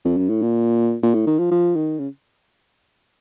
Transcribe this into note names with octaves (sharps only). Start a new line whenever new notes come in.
F2
F#2
A2
A#2
A#2
A2
D#3
F3
F3
D#3
C#3